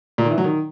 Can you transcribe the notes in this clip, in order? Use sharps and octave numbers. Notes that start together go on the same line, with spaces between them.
A#2
D#3
E3
F#3
D#3